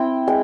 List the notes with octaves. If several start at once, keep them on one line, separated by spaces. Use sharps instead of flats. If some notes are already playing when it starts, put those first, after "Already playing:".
Already playing: C4 E4 G5
G#3 G5